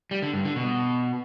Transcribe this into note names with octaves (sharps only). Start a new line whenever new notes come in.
G3
D3
G2
D3
B2